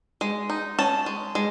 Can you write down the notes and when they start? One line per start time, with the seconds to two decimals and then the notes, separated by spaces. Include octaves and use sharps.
0.21 G#3
0.50 D#4
0.79 C#4 A5
1.06 G#3
1.35 G#3